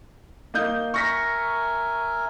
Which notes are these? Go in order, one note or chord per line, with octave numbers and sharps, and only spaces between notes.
A#3 D#4 G6
A#4 E5 G#5 C#6 A#6 B6